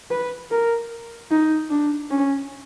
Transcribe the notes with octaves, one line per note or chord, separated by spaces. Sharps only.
B4
A#4
D#4
D4
C#4